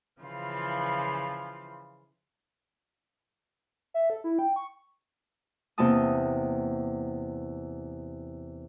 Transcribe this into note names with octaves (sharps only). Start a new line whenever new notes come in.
C#3 E3 F3 F4
E5
A4
E4
G5
C#6
E2 C3 A#3 E4 A5 D#6